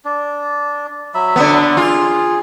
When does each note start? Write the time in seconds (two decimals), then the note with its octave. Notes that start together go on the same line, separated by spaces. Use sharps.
0.05 D4
1.14 F#3 E5 B5
1.36 D3 B3
1.77 F4 G#4